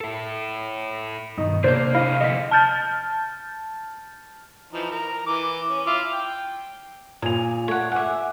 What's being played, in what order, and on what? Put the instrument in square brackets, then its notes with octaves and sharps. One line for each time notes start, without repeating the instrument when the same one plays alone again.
[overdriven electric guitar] E4 A4
[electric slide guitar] G2 B2 D#3 [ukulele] D#4
[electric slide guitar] C3 G#4 A4 [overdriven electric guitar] A#3 [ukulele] D4 D5 [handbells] C5 G6
[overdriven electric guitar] A3 D#5 [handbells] E4 [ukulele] F5
[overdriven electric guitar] F2 D3 [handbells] D#5 B6
[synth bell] A5 F6 G6 A6
[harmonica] E3 F3 D#4
A#4 A#5
E3 D6
C#4
E4 F4 D6
G5
[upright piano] A#2 F7 [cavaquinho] G#4
[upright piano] A3 [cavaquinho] C#5 F#5
[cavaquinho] E5 F#5 [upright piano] G#5 D6